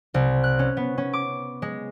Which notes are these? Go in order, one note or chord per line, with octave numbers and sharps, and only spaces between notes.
C2
F#6
C#4
B3
C#4
D6
G#3